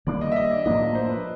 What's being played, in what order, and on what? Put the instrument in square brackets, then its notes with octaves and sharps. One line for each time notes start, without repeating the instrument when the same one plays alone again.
[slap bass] D#3 G3 A#3 D4 [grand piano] D5
[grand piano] D#5
E5
D#5
D5
[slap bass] A2 F3 A#3 D4 [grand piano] D#5
[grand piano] C5
B4